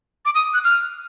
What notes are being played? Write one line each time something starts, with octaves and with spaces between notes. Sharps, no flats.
D6
D#6
F#6
F6